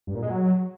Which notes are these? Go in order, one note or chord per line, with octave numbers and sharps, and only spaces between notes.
G2
A#2
G#3
F#3